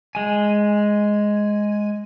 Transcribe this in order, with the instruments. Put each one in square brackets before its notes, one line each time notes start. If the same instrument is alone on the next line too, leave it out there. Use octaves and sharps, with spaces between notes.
[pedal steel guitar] G#3 G#5